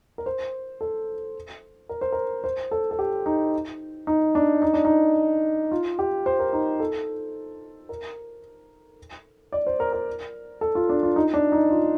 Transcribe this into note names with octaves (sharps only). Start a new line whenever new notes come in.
A#4
C5
A4
A#4
C5
A#4
C5
A4
A4
G4
D#4
D#4
D4
D#4
D4
D#4
F4
G4
C5
A#4
D#4
A4
A#4
D5
C5
A#4
A#4
A4
F4
D4
F4
D#4
D4
D#4
F4